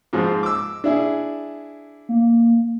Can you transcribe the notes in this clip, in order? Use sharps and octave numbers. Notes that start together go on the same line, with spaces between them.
G#2 F3 G#3
D6 E6
D4 E4 G#4
A#3